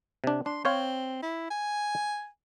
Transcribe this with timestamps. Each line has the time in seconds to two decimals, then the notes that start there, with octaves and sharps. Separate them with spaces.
0.24 C3 D4
0.46 D4 C6
0.65 C4 C5 C#5 F5
1.23 E4
1.50 G#5